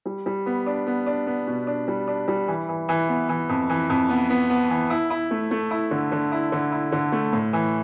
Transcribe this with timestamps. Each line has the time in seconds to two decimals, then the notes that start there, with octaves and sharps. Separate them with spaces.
0.06 G3
0.26 G3
0.46 B3
0.66 D4
0.87 B3
1.06 D4
1.27 B3
1.47 B2
1.67 D4
1.88 G3
2.08 D4
2.28 G3
2.48 E3
2.69 E3
2.89 E3
3.08 B3
3.29 E3
3.49 F2
3.69 E3
3.90 F2
4.09 B3
4.30 B3
4.50 B3
4.70 E3
4.90 E4
5.10 E4
5.31 A3
5.51 A3
5.71 E4
5.91 D3
6.12 D3
6.32 E4
6.52 D3
6.72 E4
6.92 D3
7.12 A3
7.33 A2
7.53 E3